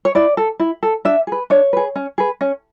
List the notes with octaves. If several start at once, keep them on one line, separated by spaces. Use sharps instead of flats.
C#5
E4 D5
A4
E4
A4
D4 E5
G#4 B4
D4 C#5
G#4 B4
C#4
G#4 B4
C#4